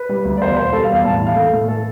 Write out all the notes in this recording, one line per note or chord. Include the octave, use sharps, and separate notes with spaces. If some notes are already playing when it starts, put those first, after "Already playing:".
Already playing: B4
G3
D2
D5
E2 C5
B2 C5
G3 A4
F5
E2
F5
A2 A5
E3
F5
A3
A2
A3 A4